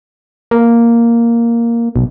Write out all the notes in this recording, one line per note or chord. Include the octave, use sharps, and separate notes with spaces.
A#3
B1